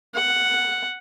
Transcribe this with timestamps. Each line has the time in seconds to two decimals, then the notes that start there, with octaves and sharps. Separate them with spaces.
0.15 F#5